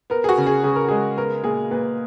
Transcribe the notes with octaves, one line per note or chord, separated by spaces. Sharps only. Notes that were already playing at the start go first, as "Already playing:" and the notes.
B3 A#4
G#4
F#4
C#3
G#4
C#3 G#4
A#4
G#3 G#4
B3 A#4
A#2 G#4
A#2 B4